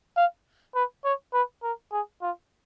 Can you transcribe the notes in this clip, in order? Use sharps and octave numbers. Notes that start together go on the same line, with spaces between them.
F5
B4
C#5
B4
A#4
G#4
F4